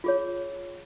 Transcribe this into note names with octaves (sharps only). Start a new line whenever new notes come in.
F4 G#4 C#5